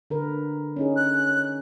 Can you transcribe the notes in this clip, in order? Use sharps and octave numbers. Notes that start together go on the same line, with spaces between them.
D3 A#4 B4
C#4 D#4 G#4
F#6